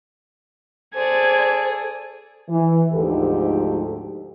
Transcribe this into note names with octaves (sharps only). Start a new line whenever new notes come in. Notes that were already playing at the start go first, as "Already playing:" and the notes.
G#4 A4 C5 D5 G#6
E3
D2 G#2 F3 D#4 G4 A4